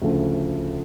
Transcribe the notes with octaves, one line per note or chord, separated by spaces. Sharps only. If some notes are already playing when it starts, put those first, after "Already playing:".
D2 C#3 F3 A3